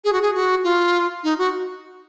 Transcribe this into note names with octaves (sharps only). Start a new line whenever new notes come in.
G#4
F#4
G#4
F#4
F4
D#4
F#4